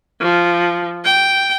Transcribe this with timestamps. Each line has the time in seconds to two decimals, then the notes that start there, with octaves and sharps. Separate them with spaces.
0.22 F3
1.05 G5